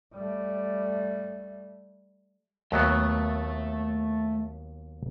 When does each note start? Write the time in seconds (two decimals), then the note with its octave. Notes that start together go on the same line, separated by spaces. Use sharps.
0.15 G3 A3
2.72 D#2 F#3 A3 B3 E5